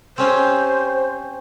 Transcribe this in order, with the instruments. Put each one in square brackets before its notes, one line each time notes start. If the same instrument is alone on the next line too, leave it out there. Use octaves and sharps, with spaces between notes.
[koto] C4 C#4 G4 [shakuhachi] C5